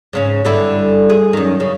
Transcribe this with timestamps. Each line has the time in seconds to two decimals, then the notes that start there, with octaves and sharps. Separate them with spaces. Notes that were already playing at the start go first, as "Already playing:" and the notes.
0.13 G#2 C#3 C#4
0.45 G2 D3 E4
1.10 G#4
1.33 F#2 D#3
1.60 C#3